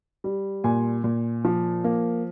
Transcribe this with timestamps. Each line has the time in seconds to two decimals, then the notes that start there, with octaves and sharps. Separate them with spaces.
0.24 G3
0.64 A#2 G#5
1.04 A#2
1.44 F3
1.84 A#3